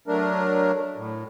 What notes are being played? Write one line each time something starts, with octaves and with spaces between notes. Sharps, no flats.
F#3 A3 D4 A#4
A2